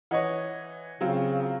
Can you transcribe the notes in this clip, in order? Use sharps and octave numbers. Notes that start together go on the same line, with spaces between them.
E3 C#5 D#5 F#5
C#3 F#3 C4 F4